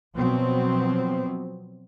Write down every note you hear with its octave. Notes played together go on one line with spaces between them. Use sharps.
B2 F3 F#3 B3 C4